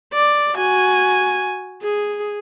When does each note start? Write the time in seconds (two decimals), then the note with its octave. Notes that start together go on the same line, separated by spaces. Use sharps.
0.13 D5
0.55 F#4 G#5
1.82 G#4